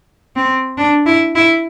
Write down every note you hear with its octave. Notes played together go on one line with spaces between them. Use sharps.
C4
D4
E4
E4